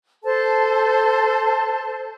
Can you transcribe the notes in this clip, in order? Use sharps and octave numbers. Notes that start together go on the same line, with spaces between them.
A4 C5 A5